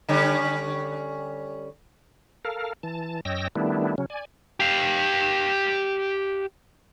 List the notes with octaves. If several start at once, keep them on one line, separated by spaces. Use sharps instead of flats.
D3 G3 C#4
A4 A#4 F5
E3 A5
F#2 C#5 D#5 G5 E6 A#6
D#3 G3 A3 B3 D4 E4
C#3 F#3 C#4
D5 G#5
G4 F5